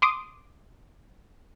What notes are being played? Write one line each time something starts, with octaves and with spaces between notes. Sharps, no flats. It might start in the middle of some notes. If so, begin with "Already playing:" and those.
C6 D6 D#6